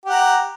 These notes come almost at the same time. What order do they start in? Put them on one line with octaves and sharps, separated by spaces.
G4 F#5 A#5